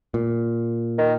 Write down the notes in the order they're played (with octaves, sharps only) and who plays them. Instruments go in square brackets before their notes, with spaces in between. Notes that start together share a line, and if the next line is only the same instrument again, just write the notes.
[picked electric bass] A#2
[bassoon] D#3